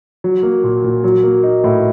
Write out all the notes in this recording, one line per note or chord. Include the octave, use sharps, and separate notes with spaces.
F#3
A#3
A#2
A#2
F#3
A#3
D#4
A2